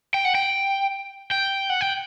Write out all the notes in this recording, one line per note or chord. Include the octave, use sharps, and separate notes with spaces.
G5
F#5
G5
G5
F#5
G5